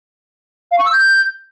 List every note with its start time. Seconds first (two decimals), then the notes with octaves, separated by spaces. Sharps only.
0.71 F5
0.79 C#6
0.86 E6
0.93 G6